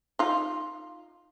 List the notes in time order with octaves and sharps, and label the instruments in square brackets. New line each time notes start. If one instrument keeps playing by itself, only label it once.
[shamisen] D#4 F4